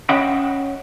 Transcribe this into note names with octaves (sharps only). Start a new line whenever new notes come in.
C#4 D#5 E5 F#5 G5 B5